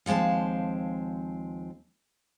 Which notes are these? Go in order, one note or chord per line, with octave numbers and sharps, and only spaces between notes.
D#2 F3 G#3 C4 A5